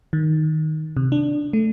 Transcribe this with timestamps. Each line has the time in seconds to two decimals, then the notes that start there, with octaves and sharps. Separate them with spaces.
0.13 D#3
0.97 C3
1.12 D4
1.53 A3